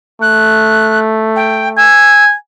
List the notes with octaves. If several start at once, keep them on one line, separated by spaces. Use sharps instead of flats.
A3 F#6
G5
G#5 E6